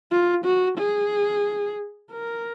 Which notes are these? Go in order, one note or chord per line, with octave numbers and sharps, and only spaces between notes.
F4
F#4
G#4
A#4